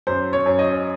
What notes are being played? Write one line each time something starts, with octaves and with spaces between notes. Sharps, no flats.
F#2 C5
C#5
F#2
D#5